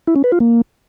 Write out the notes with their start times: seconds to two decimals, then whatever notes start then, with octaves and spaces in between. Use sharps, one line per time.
0.07 E4
0.16 C#4
0.24 B4
0.32 F4
0.40 A#3